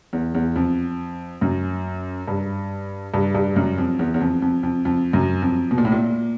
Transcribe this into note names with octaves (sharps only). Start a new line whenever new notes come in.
E2
E2
F2
F#2
G2
G2
G2
F#2
F2
E2
E2
F2
F2
F2
F2
F#2
F2
B2
A#2
A2
A#2